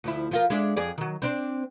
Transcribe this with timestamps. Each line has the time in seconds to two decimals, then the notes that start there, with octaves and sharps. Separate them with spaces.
0.04 D2 F3 E4
0.31 F3 F4 A#4
0.50 G#3 D4 E5
0.76 F2 G#4 D5
0.98 D#3 F#3
1.22 C4 D4 C5